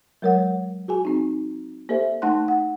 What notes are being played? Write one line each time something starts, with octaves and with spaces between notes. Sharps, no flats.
F#3 G#3 A#4 C#5 F#5
F#4 G#4 G#5
C4 D#4
A#3 G4 A4 C5 D5 E5
A3 D#4 F#5 A5 C6 F#6
F#5